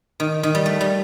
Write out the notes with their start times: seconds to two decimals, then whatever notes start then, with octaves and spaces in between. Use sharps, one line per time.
0.20 D#3
0.43 D#3
0.55 G3
0.66 A3
0.81 G3